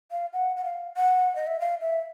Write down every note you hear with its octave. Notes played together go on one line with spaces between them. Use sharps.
F5
F#5
F#5
F5
F#5
D#5
E5
F5
E5